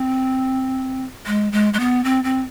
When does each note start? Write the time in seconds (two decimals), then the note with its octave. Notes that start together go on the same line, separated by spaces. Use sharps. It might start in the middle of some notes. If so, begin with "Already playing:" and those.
Already playing: C4
1.27 G#3
1.52 G#3
1.73 G#3
1.79 B3
2.04 C4
2.24 C4